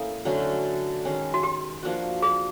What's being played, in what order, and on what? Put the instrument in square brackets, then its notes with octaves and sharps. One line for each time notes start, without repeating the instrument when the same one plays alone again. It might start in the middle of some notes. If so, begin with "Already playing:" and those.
Already playing: [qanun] A#3 C#4 E4 [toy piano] A4
[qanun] D3 F#3 A3 C#4
D#3 G#3 C#4
[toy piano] F#4
G4
[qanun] F3 A#3 D4 F#4
[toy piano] G#4